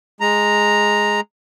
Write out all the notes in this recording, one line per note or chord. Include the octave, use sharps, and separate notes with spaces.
G#3 A#5